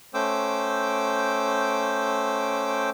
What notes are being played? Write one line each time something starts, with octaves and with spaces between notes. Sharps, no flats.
A3 C#4 C5 G5 D6 E6